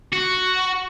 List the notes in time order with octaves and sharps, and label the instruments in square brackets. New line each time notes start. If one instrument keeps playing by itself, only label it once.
[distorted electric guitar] F#4